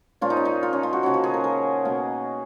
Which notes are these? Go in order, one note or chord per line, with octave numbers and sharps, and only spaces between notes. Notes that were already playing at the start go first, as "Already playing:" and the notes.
A#2 F3 A#3 C#4 F4
D#4
C#4
D#4
F4
C#4
F4
F#4
C#3 F3 A#3 C#4 F#4
F#4
G#4
A#4
A#4
B2 A#3 C#4